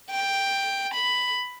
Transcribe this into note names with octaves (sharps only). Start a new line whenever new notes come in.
G5
B5